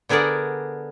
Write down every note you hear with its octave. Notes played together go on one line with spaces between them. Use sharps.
D3 B3 G#4 A#4 D5 F#5